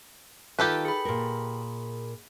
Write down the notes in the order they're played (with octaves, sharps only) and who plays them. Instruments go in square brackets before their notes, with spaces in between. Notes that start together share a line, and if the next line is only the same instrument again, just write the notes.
[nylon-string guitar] D#3 F4 [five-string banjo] G4 A4 B4
[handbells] G#4 B5
[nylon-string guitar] A#2 A#4